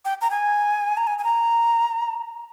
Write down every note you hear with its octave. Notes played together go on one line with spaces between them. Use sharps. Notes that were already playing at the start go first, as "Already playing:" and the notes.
G5
A#5
G#5
A#5
G#5
G#5
A#5